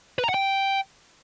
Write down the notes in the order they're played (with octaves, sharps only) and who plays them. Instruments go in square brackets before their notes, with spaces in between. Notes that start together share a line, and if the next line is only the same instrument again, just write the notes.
[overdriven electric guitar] B4
A#5
F#5
G5